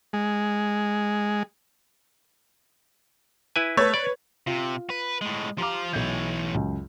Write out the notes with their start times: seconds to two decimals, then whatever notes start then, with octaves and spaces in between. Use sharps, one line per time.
0.13 G#3
3.56 E4 B4 G#5
3.77 A3 B4 C#5
3.94 D5
4.47 C3 F4
4.90 B4
5.21 A2 G#3
5.58 F3 G4 F5 A#5 D6
5.93 B1 E3 C#5 G6
6.54 C#2 F#2